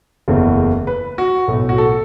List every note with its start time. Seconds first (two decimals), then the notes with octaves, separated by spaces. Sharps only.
0.28 F#1 E2 C#3 E3 A3
0.87 B4
1.18 F#4
1.48 B1 A2 A3
1.69 F#4
1.78 A4